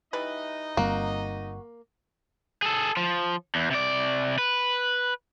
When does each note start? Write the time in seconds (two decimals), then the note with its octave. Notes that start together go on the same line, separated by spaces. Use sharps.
0.13 E3 G3 D#4 B4 D#5
0.77 G1 G3 A#3 C4 F#4
2.62 G#4 A4
2.97 F3
3.55 E2
3.71 C3 D5
4.38 B4